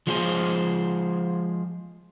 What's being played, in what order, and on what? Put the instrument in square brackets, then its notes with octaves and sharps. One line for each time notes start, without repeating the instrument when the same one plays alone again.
[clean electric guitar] F3 G#3 F4 G#4 C5